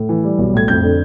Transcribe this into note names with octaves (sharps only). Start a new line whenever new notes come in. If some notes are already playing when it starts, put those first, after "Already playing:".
Already playing: A2
E3
G3
B1
A2 G#6
F2 G6
D3